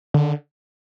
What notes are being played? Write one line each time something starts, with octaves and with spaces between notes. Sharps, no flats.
D3